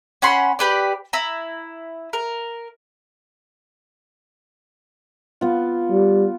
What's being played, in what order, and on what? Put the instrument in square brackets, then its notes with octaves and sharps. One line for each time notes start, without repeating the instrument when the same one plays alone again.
[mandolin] C#4 F#5 B5 C6
G4 B4 D5
E4 A#5
A#4
[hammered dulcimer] B3 F4
[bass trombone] G3